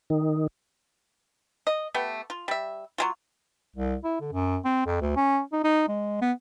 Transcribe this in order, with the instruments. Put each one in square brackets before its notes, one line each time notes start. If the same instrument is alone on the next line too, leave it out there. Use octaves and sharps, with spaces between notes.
[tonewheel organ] D#3
[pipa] D#5
A3 B3 G4
F4
G3 E5
F#3 G#3 F4
[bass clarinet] C2
E4
D3
F#2
C4
F2
D2
C#4
D#4
D#4
G#3
B3